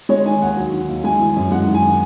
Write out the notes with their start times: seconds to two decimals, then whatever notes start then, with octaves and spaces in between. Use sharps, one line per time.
0.09 G#3 C#5
0.25 D#3 G#5
0.41 D#2 F#5
0.57 F#3
0.73 D#3
0.89 D#2
1.04 G#3 G#5
1.19 E3
1.36 F#2
1.52 G#3 F#5
1.67 D#3
1.75 G#5